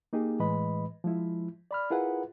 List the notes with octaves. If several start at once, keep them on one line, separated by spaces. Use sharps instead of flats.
A#3 D#4 G4 G#4
A2 E3 G#3 B4 D#5 B5
F3 G#3 E4
D5 B5 F6
E4 F4 G#4 A#4 B4 F#5